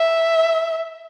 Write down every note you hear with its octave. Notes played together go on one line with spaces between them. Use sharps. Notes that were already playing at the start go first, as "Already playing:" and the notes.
Already playing: E5